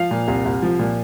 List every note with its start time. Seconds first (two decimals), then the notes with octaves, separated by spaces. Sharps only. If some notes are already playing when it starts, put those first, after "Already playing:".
Already playing: F3 F5
0.11 A#2
0.28 C2
0.45 C2
0.62 F3
0.79 A#2